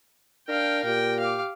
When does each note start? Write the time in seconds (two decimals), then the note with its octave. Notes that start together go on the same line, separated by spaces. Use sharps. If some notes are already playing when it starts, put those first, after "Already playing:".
0.48 D4 A#4 F5 G5
0.84 A#2 G4 G5
1.19 F5 D6